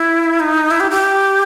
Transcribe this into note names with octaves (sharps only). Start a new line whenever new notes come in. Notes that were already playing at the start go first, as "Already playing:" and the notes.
Already playing: E4
D#4
E4
G4
G4